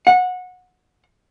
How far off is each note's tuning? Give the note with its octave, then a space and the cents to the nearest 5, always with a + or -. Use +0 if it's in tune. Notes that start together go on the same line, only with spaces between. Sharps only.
F#5 -20